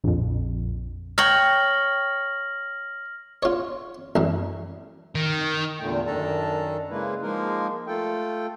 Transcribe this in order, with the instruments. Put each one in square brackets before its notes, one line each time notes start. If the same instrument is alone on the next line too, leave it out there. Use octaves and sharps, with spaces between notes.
[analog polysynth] A#1 F2
[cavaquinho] C#5 G5 [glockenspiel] F6 A#6 F#7
[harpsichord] F4 C#5
A1 F#2
[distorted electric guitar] D#3
[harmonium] E2 A#2 D3 A3 G5
F#2 D#3 D4 A4 A5 A#5
C#3 G#3 A#3 E4 B4
F3 G#3 A#3 D#4 A#4
A3 F4 A4 G5